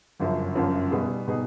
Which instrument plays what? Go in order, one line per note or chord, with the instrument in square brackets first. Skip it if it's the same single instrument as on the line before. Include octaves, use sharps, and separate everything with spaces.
[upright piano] G1 F#2 C#3 F3
G1 F#2 C#3 F3
B2 G3 B3 D#4 G#4
B2 G3 B3 D#4 G#4